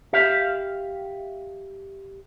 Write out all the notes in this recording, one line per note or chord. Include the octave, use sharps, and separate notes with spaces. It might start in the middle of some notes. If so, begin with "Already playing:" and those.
G4 E5 F5